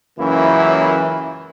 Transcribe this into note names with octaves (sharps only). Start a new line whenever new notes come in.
C#2 F#2 E3 A#3 C#4 E4